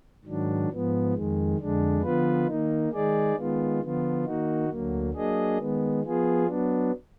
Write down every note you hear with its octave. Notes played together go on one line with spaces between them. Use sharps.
G#2 D#3 F#3 D4
G#2 F3 B3
F2 D#3 G#3
F2 D3 G#3 D4
D3 F3 B3 F4 B4
D#3 A#3 D#4
D#3 G#3 D#4 G#4 D5
D#3 G#3 B3 F4
D3 F3 B3 F4
D#3 A#3 D#4 F#4
D2 D3 F#3 A#3
F#3 A#3 D4 G#4 D#5
D#3 G#3 B3
F3 B3 F4 G#4
F#3 B3 D4